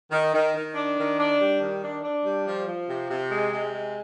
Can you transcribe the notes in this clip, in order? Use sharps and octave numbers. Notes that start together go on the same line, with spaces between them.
D#3
D#3
D#3
D4
D#3
D4
G3
D#3
D4
D4
G3
F3
F3
C3
C3
G#3
C3
G#3